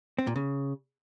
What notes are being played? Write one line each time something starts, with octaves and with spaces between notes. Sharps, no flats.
C4
A#2
C#3